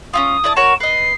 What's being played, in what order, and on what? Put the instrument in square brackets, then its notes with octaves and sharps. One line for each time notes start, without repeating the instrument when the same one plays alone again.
[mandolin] C#4 E4 F4 [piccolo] D#6
[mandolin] E4 D5 A5
[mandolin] F#4 A#4 C#5 [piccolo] E7
[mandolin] B4 D#5 [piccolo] C7